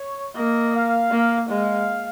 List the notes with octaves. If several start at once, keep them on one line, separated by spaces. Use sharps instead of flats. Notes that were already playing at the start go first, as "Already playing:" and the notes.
Already playing: C#5
A#3 D#5
F5
A#3
G#3 F5